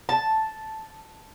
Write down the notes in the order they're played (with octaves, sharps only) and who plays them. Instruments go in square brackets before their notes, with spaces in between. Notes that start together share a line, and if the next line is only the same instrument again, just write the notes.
[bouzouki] A5